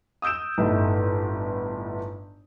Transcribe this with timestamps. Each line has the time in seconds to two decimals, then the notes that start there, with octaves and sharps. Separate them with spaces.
0.22 D#6 E6 G6 D7 E7
0.58 G1 A2 A3 D#4 E4